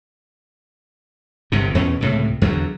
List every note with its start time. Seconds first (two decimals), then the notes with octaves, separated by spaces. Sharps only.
1.52 G1 G2 C3
1.75 E2 B2 C#4
2.01 C#2 A2 C3
2.42 E2 D3 F#3